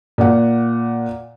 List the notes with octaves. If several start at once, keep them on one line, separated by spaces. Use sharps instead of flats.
A#2 F#5